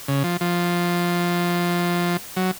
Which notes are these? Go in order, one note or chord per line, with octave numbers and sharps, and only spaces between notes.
C#3
F3
F3
F#3